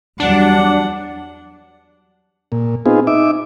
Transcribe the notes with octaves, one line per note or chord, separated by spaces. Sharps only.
E2 F#3 G3 D4 F#5
A#2
B3 C4 D#4 F4 G#4
D#4 E5 D6